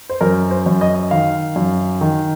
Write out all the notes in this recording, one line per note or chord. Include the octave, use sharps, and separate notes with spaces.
C5
F#2 A#4
C5
F#2
D#5
D#3 F5
F#2
D#3